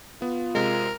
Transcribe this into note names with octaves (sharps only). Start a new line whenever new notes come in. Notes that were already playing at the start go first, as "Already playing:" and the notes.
B3 F4
C3 G#3 A#4